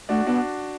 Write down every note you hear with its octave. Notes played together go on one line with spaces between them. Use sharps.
A3 D4 F#4
B3 D4 F#4